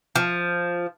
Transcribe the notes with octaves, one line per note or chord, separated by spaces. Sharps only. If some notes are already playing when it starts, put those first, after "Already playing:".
F3